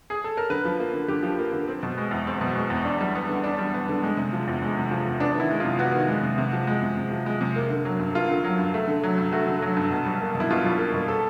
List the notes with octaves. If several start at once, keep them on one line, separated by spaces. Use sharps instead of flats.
G#4
A4
A#4
D3 B4
F3
A#3
D3
D3 G4
F3
A#3
D3
C4
B2
G#3
E2
C4
B2
G#3
E2
D4
G3
B3
D3
D4
G3
B3
D3
G#3
C3
F3
E2
G#3
C3
F3
E2
B3 D4
D#3 E4
G#3
F4
C3
B3 F#4
D#3
G#3
C3
C3
F3
G#3
C3
C3
F3
G#3
C3
A#3
D3
F#3
G2
A#3 F4
D3
F#3
G2
A3
D3
F#3
G2
A3 F#4
D3
F#3
G2
B2
G3
A#3
B2
E4
B2 F4
G3
A#3
B2
A4